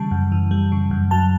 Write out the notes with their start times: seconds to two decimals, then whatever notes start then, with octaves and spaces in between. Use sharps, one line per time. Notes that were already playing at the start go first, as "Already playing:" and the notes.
Already playing: C#3 E3 G3 A5
0.11 F#2
0.32 E3
0.51 G3
0.72 C#3
0.91 F#2
1.11 F#3 A5